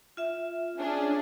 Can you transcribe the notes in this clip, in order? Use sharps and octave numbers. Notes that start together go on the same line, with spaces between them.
F4 E5
C#4 D4 G#4